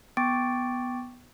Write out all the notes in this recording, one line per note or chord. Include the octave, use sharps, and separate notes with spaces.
B3 G5 C#6 D6 A6 D7